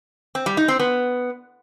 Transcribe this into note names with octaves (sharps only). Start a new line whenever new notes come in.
C4
G3
D#4
C4
B3